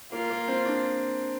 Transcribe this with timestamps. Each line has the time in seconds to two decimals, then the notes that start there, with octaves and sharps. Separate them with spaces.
0.12 A#3 F4
0.30 A#3
0.48 C4
0.66 D4